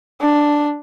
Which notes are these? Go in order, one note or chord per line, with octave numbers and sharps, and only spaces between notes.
D4